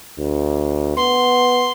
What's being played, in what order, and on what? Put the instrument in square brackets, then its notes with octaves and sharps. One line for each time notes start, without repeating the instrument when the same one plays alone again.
[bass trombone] D2
[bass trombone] B3 [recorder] C6